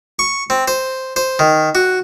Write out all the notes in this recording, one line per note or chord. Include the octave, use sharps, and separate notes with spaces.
C#6
C4
C5
C5
D#3
F#4